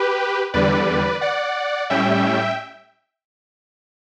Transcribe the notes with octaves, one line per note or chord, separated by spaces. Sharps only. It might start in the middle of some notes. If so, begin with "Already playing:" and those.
Already playing: G4 B4
E2 D3 G3 B4 D5
D5 F#5
A2 G3 C#4 E5 G5